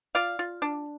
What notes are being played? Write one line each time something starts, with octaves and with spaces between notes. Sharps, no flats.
F4 D5 F5
F4
D4